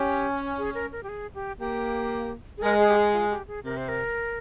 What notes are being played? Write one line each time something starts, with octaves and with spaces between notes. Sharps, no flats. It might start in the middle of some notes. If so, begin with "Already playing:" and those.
Already playing: C#4 G4
G#4
A#4
A#4
G4
G#4
G4
A#3 G4
G#4
G#3 A#4
G#4
G4
G#4
F4
G4
G#4
C3 A#4
C5
A#4